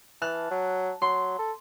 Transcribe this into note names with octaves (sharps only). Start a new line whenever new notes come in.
E3 A5 F6 F#6
F#3
F#3 C6
A4